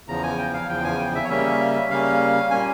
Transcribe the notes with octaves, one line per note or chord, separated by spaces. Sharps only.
E2 C#3 F3 A#5
G#5
G5
F5
E2 C#3 F3 G5
G#5
G5
E5
C#5
C#3 G3 A#3 C#4 E5
C#3 G3 A#3 C#4 F5
A#2 G3 A#3 C#4 G#5